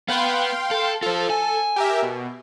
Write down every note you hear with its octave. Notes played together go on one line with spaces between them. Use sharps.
B3 B4 F5 G5 C6
A4
F4 A4 C5
G#5
G4 A#4 E5
B2